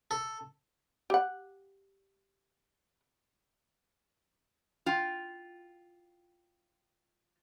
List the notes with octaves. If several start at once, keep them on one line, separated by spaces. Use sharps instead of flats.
A4
G4 F#5
F4 G5